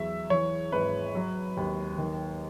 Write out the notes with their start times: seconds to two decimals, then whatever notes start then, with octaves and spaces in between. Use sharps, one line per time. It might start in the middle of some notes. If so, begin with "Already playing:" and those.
Already playing: E2 F#3 E5
0.30 E3 C#5
0.72 G#1 B4
1.15 F#3
1.57 D#2
1.98 D#3